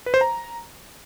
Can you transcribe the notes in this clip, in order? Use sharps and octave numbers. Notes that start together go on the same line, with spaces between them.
B4
C5
A#5